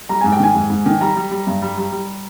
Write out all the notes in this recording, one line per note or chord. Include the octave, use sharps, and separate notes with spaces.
G3 A#5
G#2 G#5
G5
D#3 G#5
G#2
G#2
D#3
G3 A#5
G3
G3
G2
G3
G3
G3